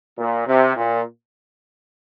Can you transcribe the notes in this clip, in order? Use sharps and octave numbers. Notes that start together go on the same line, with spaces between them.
A#2
C3
A#2